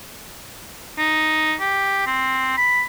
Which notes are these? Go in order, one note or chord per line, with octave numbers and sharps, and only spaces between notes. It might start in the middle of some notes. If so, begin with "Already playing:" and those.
D#4
G4
C4
B5